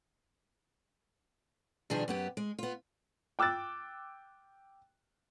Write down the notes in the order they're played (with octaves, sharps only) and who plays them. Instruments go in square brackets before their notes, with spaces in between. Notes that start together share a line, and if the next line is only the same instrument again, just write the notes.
[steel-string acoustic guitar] B2 D#3 F3 G3 D4 G#4
F#2 B3 G4
G#3
B3 F4
[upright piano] G5 D6 E6 F#6 A6